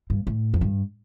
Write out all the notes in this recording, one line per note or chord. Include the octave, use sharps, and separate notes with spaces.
G2
A2
F2
G2